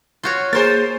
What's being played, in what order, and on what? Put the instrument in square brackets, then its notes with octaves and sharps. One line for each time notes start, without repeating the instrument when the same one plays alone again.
[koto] F4 F#4 C#5
[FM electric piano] A#3 G#4 [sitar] A#4 C5 [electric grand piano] A6